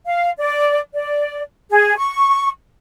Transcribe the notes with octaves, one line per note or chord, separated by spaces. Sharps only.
F5
D5
D5
G#4
C#6